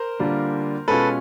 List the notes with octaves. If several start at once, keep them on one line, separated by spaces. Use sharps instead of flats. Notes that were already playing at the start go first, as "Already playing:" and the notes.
Already playing: A#4 C5
D3 G3 A#3 D4 F4
B2 G#3 C#4 F4 A4 B4